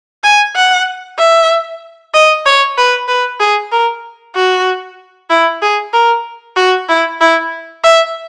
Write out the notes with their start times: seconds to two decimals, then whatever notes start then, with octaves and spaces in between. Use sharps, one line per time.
0.24 G#5
0.56 F#5
1.19 E5
2.14 D#5
2.46 C#5
2.78 B4
3.08 B4
3.40 G#4
3.72 A#4
4.35 F#4
5.30 E4
5.62 G#4
5.93 A#4
6.56 F#4
6.89 E4
7.21 E4
7.83 E5